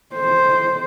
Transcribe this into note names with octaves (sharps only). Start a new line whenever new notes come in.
C5